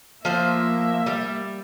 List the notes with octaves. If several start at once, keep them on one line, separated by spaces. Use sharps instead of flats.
F3 A#3 C5 E5
G3